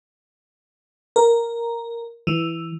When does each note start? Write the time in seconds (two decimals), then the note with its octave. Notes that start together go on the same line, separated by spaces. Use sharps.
1.16 A#4
2.27 E3